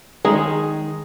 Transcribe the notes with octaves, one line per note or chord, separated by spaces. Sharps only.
D#3 G#3 G#4